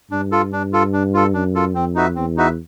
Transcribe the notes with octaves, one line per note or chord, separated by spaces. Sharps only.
G2 D4
F4 A4
D4
F4 A4
D4
F4 A4
F#2 D4
F4 A4
F2 C4
D#4 F#4 B4 E5
E2 C4
D#4 F#4 B4 E5